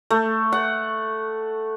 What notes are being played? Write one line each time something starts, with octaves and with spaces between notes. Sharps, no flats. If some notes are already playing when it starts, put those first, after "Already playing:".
A3
F#5